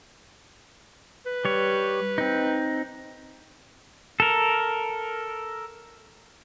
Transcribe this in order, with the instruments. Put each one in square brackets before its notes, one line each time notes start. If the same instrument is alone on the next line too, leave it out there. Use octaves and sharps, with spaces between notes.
[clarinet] B4
[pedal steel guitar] G3 C#5
C4 D#4
A4 A#4